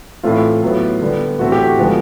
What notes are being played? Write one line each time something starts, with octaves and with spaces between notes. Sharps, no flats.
A2 E3 A3 C4 F4
A2 F#3 B3
D3 G3 B3
A2 E3 A3 C4 F#4
G4
F#4
D3 F3 G#3 B3